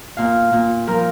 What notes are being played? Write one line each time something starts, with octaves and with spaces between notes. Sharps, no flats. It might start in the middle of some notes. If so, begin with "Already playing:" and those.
A#2 F5
A#2
F3 A#4